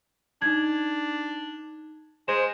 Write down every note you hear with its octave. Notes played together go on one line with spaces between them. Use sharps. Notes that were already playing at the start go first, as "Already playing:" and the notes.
D4 D#4 G#6
G#3 C5 E7